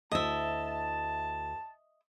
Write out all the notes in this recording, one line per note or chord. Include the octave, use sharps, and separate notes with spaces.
D2 E4 D#5 E5 A5